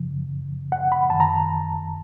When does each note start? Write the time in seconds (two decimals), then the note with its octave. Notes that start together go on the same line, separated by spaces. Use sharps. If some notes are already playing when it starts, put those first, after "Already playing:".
Already playing: F#2 C#3 F3
0.72 F#5
0.92 B5
1.10 F#2 D#3 A5
1.20 A#5